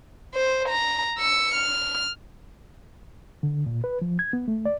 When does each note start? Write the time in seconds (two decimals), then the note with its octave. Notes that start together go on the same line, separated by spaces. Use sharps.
0.35 C5
0.69 A#5
1.18 E6 C#7
1.55 F6
3.43 D3
3.66 A#2
3.84 B4
4.02 F3
4.19 G#6
4.33 B3
4.48 A3
4.65 D5